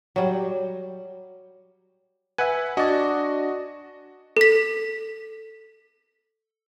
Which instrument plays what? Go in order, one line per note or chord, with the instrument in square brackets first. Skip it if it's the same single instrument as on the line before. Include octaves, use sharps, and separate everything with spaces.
[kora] F#3 G3
[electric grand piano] B4 F#5 [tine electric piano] E5 G#5
[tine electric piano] D4 D5 [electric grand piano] F#4 D#5
[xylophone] A4 B6